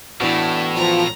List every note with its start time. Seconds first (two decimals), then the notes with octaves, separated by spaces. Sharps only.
0.21 A2 E3 B3 D4 E4 F#4
0.76 F3 A#5